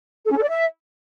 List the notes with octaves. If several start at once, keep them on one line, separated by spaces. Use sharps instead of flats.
A4
C#4
A4
D5
E5